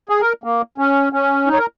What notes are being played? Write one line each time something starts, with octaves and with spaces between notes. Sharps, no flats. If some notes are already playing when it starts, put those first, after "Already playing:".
G#4
A#4
A#3
C#4
C#4
D#4
C#5
A#4